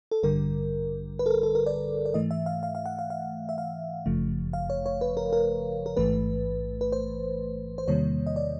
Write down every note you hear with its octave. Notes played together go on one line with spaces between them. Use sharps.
A4
A1 G2 D3 G3 A#4
B4
A4
A#4
A4
A#4
D5
D5
G#2 E3 A3 D#5
E5
F5
F5
F5
F#5
F5
F5
E5
F5
G1 F#2 C#3 F3 A3
F5
C#5
C#5
B4
A#4
A#4
A#4
A1 G#2 E3 A3 B4
B4
C5
C5
E2 C3 D#3 G3 A#3 C#5
D#5
D5